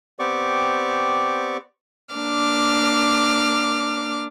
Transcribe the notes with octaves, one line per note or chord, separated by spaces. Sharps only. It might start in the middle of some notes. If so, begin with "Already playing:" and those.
B3 C4 G4 D5 C#6 D6
A#3 D4 D6 F6